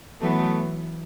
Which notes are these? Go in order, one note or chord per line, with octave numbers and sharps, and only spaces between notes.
E3 F#3 A3 B3